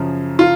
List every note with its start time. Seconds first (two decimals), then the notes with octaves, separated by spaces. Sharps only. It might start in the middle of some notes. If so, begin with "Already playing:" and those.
Already playing: F#2 C#3 F3
0.39 F4